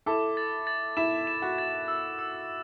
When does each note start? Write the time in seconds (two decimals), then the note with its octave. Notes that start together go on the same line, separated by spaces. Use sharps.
0.06 E4 A4 D6
0.37 A6
0.67 A6
0.97 E4 E7
1.27 E7
1.42 F#4
1.58 A6
1.88 E6
2.19 E6